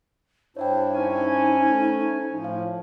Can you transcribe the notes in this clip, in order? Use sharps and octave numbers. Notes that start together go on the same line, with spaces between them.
G2 D4 E4 C5 C#5 E5 G5
C#4 D#4 C5 G#5
A3
A2 F3
F5